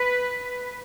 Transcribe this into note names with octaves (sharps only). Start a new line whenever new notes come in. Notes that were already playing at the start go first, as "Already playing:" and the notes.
Already playing: B4